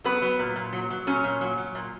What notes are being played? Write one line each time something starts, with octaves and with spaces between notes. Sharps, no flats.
F#3 B3 B4
F#3
A#2
A#2
F#3
F#3
A#2 C#4 C#5
A#2
F#3
F#3
A#2